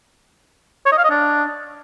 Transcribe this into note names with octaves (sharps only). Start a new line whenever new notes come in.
C#5
D#5
F5
D#5
D4